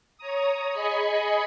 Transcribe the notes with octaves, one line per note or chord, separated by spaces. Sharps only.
C#5 A#5 D#6
G#4 D#5 G#5 B5 C#7